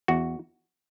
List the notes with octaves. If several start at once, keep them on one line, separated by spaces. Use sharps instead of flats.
E2 F#4